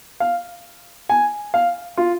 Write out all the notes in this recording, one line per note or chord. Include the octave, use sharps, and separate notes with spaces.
F5
G#5
F5
F4